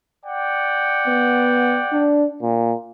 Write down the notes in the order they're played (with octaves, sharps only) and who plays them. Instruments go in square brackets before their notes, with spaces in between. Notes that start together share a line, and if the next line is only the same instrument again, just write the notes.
[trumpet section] D5 F#5 G5
[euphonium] B3
D4
A#2